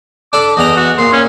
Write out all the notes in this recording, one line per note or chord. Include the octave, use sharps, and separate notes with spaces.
D4 A4 B5 D6
E2 E3 D#5 A#5
F#4
A#2 C6
C#4